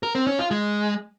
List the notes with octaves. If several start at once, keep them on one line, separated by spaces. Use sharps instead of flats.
A#4
C4
C#4
F4
G#3